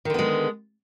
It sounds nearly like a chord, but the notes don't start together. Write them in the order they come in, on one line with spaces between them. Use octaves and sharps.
D#3 D3 B3 G#3